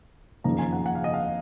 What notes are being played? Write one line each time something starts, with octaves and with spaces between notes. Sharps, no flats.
F#1 F2 D#3 A#3 A#5
G#5
F#5
F#5
F5
D#5
F5